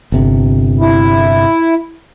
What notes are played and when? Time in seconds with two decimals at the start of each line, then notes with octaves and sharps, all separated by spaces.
0.12 G1 C3
0.80 E4